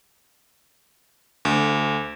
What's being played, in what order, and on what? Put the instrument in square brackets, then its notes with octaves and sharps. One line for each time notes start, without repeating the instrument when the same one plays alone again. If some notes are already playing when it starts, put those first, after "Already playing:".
[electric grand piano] D2